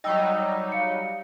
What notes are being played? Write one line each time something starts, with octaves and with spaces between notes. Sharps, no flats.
F#3 G3 D#4 D#5 G5 E6
F5 C#7